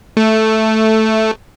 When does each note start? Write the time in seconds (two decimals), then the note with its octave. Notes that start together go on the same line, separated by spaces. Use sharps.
0.17 A3